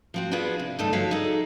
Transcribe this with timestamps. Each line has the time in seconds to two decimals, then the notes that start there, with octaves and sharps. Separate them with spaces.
0.14 F3 C4 F#4
0.31 B3 D4 F4 F#4 G#4 B4
0.59 C3
0.79 D2 G2 A3 D#4 A4
0.93 F3 G#3 F#4 C#5 E5 F5
1.11 D#4 G#4 A4